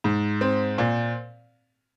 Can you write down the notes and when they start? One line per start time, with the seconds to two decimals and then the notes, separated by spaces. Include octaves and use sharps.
0.04 G#2
0.41 C4
0.78 A#2